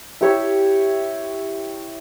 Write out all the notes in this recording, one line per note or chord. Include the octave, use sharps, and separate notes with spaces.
E4 G4 C#5 E5